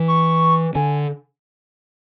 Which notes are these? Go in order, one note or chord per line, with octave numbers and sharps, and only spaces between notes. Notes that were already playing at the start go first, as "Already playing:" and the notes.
Already playing: E3
C#6
D3 G#5